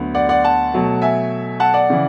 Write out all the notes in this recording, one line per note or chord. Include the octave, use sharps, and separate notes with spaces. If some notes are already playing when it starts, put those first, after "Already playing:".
Already playing: D2 D3 F#3 B3
D5 F#5
D5 F#5
F#5 A5
B2 F#3 A3
E5 G#5
F#5 A5
D5 F#5
C#3 E3